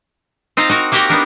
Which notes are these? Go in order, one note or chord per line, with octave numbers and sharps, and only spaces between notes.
C4 D#4 F4 F5 A#5
D#4 F#4 A#4
A#3 F#4 G4 F#5 G5 A#5
B3 D4 D#4 A#4